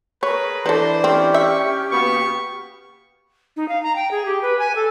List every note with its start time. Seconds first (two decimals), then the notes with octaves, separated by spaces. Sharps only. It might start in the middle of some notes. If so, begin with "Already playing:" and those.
0.23 G#4 A#4 B4 C#5
0.66 E3 D4 A4 B4 C5
1.04 C4 C#4 G4 F6
1.34 E5 C#6
1.92 B2 A#3 B3 C#6
3.57 D#4
3.69 F5
3.83 A#5
3.96 G5
4.11 G#4
4.26 G4
4.43 B4
4.59 G#5
4.75 A4